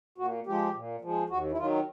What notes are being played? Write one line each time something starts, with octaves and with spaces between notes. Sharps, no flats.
A#2 F#4
F3 G#3 G4
A#2
F3 G#3
D#2 F#4
E4
D#3 F#3 F4